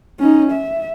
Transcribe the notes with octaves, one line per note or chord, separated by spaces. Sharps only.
C#4 D#4
E5